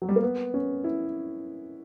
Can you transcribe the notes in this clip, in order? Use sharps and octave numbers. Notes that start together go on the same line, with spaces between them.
F#3
G3
A#3
B3
C#4
E4